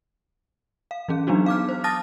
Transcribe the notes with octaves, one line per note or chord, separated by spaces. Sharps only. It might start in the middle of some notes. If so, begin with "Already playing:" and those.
F5
E3 C#4 G#4
F#3 B3 D4 D#4 F#4
F5 D6 F6
C5
A5 D#6 F6 A6 A#6